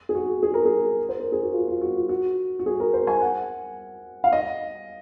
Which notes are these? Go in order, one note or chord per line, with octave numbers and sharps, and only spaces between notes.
G#4
F#4
G#4
A#4
G#4
C5
A#4
G#4
F#4
F4
F4
F#4
F4
F#4
F#4
G#4
A#4
C5
G#5
F#5
F5
D#5